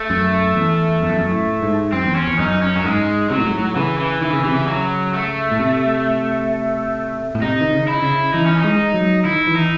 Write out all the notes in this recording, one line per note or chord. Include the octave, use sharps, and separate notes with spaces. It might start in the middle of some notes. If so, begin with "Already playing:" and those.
Already playing: A3
F#2
E2
F#2
E2
F#2
A2
G#2
F#2 C4
E2
C#4
E2
F#2 D#4
C#4
F#2 F#3
G#2 G#3
C3 F#3
A2
G#2
A2
C#3 E3
E3
D#3 E3
C#3
C3 E3
C#3
F#3
A3
A2
C3
A2
C3 D#4
D#3
C#3
E4
C#3
E3 D#4
C#4
D#4
G#3
F#3
D#3 E4
E3
D#4